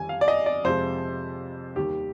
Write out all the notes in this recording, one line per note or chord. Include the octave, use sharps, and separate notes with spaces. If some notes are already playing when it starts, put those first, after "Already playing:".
Already playing: F2 D#3 G3 G#5
F5
D5
D#5
D5
F2 C3 F3 G#3 C5
D#2 D#3 G3 G4